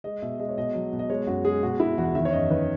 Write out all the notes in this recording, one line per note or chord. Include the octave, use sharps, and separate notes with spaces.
G#3 D#5
B2 E5
G#3 D#5
C#5
B2 D#5
F#3
B2
D#5
G#3 C#5
F#2 F#4
G#3 G#4
B2 F#4
B2 E4
E2 F#4
D#3 E5
C#5
F#2 D#5
D#3 B4